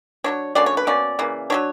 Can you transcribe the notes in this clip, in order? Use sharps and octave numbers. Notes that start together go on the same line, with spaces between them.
F#3 A#3 D4 C#5
D3 F#3 A#3 C#4 D5
C#5
B4
B2 A#3 C#4 D5
C#3 E3 A#3
F#3 B3 D4 C#5